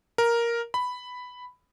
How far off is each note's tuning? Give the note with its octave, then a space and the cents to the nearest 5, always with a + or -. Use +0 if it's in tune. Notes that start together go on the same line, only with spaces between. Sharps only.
A#4 +5
B5 +5